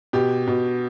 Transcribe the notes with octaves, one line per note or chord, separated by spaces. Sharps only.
B2 G4
B2